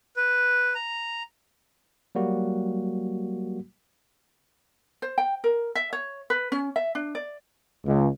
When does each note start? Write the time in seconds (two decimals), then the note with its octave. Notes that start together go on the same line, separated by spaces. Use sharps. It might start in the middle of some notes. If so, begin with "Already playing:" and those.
0.17 B4
0.75 A#5
2.15 F#3 G3 A#3 F#4
5.02 C5
5.18 G5
5.44 A#4
5.75 E5
5.93 C#5
6.30 B4
6.52 C#4
6.76 E5
6.95 D4
7.15 D5
7.85 C#2